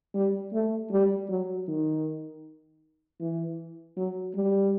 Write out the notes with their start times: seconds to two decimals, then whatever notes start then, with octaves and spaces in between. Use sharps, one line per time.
0.15 G3
0.53 A3
0.92 G3
1.29 F#3
1.68 D#3
3.21 E3
3.97 F#3
4.35 G3